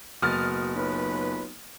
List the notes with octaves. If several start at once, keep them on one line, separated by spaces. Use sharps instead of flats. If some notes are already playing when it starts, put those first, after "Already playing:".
F#1 B2 D#6 F6 A6
B1 C#4 F4 B4